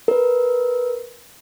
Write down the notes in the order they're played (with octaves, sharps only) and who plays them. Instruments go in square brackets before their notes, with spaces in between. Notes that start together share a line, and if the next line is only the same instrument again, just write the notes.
[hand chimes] A#4 B4